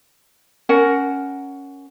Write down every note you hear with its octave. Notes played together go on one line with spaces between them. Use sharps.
C#4 A#4 F#5